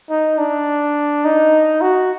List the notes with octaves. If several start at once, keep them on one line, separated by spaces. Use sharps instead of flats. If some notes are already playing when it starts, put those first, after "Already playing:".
D#4
D4
D#4
F#4